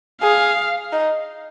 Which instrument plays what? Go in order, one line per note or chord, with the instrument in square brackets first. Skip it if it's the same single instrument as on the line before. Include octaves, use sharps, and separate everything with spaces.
[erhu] G#4 [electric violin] F5
[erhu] D#4